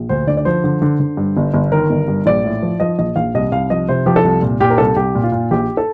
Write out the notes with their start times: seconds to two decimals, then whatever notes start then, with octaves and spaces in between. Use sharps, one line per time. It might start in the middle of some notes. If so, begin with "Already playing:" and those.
Already playing: A#1
0.09 D2 C5
0.27 D3 D5
0.37 D5
0.45 F3 C5
0.64 D3
0.82 D3
1.00 D3
1.17 G2
1.37 G1
1.54 G1
1.72 D#3 A#4
1.90 G1
2.08 G2
2.26 A#1 D5
2.45 A2
2.63 F3
2.80 F3 D#5
2.99 A#1 D#5
3.16 A#1 F5
3.35 C2 D#5
3.52 C2 F5
3.70 F3 D#5
3.89 C3 C5
4.06 F3 G4
4.16 A4
4.24 C2
4.42 A#2
4.60 A#2 G4
4.70 A#4
4.78 C2 A4
4.96 C2 G4
5.15 A#2
5.23 F4
5.32 A#2
5.51 A#1 G4
5.77 A4